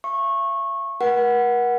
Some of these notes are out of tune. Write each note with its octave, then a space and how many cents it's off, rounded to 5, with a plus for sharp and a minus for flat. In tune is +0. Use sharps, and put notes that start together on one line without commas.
E5 +45 C#6 -20
A#4 +45 F#5 +0